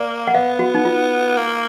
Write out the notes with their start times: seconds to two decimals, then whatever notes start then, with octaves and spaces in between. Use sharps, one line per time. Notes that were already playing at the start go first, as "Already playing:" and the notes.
Already playing: A#3 D5
0.27 F#5
0.34 B3 F5
0.59 F#4
0.75 D#4
0.85 F4
1.37 A#3